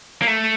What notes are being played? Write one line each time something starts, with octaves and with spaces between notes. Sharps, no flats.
A#3
A3